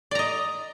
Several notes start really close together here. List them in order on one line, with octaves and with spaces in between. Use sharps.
D5 A#5 D#5